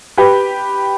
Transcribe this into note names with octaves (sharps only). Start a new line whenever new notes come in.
G4 B4